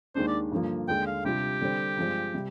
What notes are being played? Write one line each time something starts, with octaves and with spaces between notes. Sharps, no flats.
D#2 D#3 G#3 D4 C5
D5
G2 D3 F3 A#3
D#2 D3 G#3 G5
F5
C3 G3 D4 F4 G4
D3 G3 C4
G2 F3 G#3 C4
C3 G3